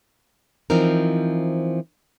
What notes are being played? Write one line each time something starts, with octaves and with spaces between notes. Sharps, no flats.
E3 F3 C4 D#4 A#4